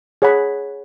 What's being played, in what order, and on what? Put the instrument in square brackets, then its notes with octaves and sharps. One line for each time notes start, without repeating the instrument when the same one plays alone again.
[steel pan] G#4 C#5 F#5 B5